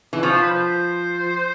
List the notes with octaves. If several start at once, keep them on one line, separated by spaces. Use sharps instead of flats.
E3
F3 C#5
C5
B4
C5